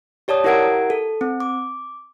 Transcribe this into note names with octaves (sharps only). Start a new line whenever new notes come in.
G4 C#5 D5 A5 D#6
E4 G4 A#4 F#5 G#6 D7
A4
C4
D6